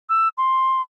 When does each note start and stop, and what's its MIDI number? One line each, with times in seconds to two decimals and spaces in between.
0.09 0.28 88
0.38 0.81 84